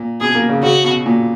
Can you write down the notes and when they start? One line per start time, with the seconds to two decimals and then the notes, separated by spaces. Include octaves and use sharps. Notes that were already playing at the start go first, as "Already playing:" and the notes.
Already playing: A#2
0.21 B2 G#4
0.35 A#3
0.49 C#3
0.63 C#3 F#4
0.84 B2
1.06 A#2